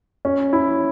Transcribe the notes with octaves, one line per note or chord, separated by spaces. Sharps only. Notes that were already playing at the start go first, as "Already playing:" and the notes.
C#4
E4